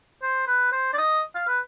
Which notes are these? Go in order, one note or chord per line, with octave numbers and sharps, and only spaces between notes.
C5
B4
C5
D5
D#5
F5
B4